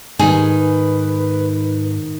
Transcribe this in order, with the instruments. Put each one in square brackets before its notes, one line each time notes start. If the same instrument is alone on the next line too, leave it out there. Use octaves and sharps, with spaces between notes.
[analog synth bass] G#2 [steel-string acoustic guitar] D#3 [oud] G#4 [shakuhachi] B4